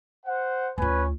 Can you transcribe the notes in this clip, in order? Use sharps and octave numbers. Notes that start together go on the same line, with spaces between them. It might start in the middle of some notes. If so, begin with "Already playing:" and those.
C5 F#5
D2 C#4 F4 B4 G#5